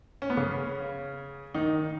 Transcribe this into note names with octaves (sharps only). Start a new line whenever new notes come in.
C#4
B3
C#3 C#4
D#3 D#4